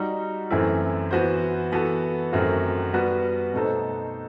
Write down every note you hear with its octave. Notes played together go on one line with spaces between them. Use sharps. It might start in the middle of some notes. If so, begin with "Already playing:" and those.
Already playing: G3 D#4 F#4
F#2 E3 A3 C4 E4
E3 B3 F#4 C5
E3 B3 F#4 A4
F#2 D#3 A3 C4 F#4
G3 B3 F#4 B4
B2 A3 D#4 A4 C5